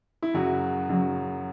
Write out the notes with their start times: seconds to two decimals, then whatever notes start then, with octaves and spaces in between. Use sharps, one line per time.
0.23 E4
0.34 F#2 C#3 F#3 F#4
0.89 F#2 C#3 F#3